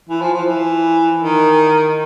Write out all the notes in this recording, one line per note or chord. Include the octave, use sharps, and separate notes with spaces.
E3
F3
F3
E3
D#3